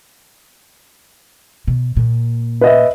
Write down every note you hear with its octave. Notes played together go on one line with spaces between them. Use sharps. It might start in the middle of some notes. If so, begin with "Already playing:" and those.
B2
A#2
B4 D#5 E5